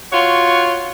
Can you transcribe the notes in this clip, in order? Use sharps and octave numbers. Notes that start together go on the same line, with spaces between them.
F4 F#4 C#5